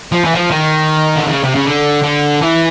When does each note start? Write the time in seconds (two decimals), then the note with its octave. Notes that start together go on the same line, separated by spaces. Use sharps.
0.12 F3
0.24 E3
0.35 F3
0.51 D#3
1.16 D3
1.28 C#3
1.43 C3
1.55 C#3
1.66 D3
2.03 D3
2.42 E3